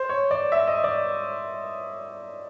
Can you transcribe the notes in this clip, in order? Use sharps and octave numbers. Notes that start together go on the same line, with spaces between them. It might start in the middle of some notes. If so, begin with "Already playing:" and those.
Already playing: C5
C#5
D5
E5
D#5
D5